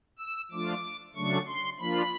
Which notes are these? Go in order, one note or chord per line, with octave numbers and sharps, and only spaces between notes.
E6
F3 A3 D4 F4 D6
C#3 F#3 A3 D4 C#6
C6
F3 A#3 D4 F4 B5